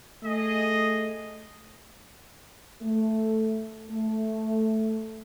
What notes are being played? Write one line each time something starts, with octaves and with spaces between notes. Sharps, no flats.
A3 G#4 D#5
A3
A3